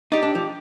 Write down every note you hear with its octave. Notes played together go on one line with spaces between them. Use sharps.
C4 D#4 G4 D5
D4
F3